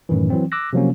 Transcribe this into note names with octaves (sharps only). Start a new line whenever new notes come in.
F#2 A2 D#3 E3
E3 F#3 C4
D6 E6 F#6 A#6
C3 F3 F#3 A#3 C#4